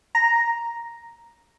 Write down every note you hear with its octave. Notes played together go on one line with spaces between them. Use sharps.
A#5